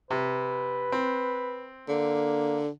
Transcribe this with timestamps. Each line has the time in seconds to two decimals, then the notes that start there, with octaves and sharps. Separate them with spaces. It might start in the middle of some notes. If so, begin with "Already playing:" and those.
0.11 C3 B4
0.92 C4
1.89 D3 A#3